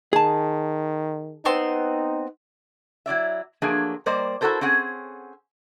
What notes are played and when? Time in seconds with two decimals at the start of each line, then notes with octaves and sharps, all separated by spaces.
0.13 D#3 G#4 A5
1.45 B3 C4 D#4 C6
3.06 F#3 E4 D5 E5
3.62 F3 F#3 A3 A#3 D4 G#4
4.06 G3 A#3 C5 D5 D#5
4.41 E4 F#4 G4 A4 A#4 C5
4.61 C4 C#4 G#4 F#5